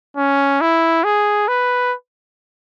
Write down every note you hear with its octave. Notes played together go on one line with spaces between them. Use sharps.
C#4
E4
G#4
B4